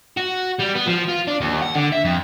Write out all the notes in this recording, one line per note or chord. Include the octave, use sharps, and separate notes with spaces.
F#4
G3
B3
F3
F4
D4
D#2
F#5
D3
E5
F2